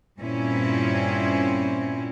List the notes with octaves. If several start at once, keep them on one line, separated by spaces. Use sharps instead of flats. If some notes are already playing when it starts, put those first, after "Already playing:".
G2 A#2 C4 C#4 E4